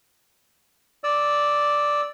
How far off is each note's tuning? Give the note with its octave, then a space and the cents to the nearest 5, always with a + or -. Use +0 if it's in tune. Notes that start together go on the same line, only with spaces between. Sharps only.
D5 +0 E6 -10